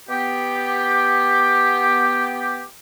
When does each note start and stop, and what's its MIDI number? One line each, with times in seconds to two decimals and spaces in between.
0.09 2.63 59
0.09 2.63 67